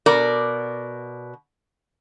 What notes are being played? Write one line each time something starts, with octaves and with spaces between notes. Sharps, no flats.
B2 A#4 D5